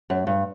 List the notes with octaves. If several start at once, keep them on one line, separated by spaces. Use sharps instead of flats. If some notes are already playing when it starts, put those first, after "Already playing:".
F#2
G2